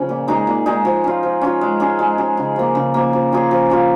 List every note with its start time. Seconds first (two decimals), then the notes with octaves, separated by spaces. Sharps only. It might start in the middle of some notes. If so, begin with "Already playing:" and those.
Already playing: C#3 F3 C#4
0.09 A#2
0.28 G#3 D#4 G#4
0.47 A#2
0.66 G#3 D#4 G#4
0.85 F3
1.04 C#4 F4
1.23 F3
1.41 C#4 F4
1.61 G#3
1.80 C#4 G#4
1.99 G#3
2.18 C#4 G#4
2.37 C#3
2.56 F3 A#3
2.75 C#3
2.94 F3 A#3
3.13 F3
3.32 C#4 F4 G#4
3.51 F3
3.70 C#4 F4 G#4